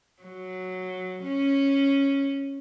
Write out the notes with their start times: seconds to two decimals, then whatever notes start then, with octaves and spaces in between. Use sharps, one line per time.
0.23 F#3
1.24 C#4